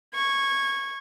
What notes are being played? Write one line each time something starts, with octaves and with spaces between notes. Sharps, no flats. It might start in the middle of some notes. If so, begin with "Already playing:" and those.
C#6 G#6